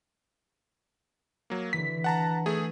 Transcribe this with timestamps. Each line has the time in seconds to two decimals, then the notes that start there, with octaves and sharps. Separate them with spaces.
1.50 F#3 A#3
1.73 D3 E3 B6
2.04 F#5 A5 A#5
2.46 A3 G#4